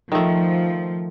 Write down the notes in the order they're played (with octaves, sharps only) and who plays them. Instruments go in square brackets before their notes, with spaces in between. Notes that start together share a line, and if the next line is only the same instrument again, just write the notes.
[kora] D#3 A3 [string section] F3